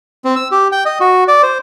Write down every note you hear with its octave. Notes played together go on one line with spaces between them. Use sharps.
C4
E6
G4
G5
D#5
F#4
D5
C5